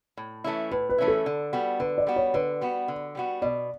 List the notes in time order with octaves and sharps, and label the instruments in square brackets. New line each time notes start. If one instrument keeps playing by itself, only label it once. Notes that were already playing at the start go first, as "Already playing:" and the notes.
[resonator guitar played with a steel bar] A2
E3 A3 C#4 E4
[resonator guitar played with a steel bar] A2 [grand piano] B4
[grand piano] B4
[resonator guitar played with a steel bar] E3 A3 C#4 E4
[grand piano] A4
[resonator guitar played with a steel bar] D3
G3 B3 F#4
[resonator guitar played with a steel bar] D3 [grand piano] B4
[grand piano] D5
[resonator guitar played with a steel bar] G3 B3 F#4
[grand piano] C#5
[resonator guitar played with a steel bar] D3 [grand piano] B4
[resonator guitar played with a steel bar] G3 B3 F#4
D3
G3 B3 F#4
[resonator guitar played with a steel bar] B2 [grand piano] D5